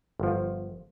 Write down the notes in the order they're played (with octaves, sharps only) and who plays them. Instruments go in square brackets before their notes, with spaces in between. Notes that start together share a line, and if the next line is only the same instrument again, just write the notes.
[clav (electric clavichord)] G1 F3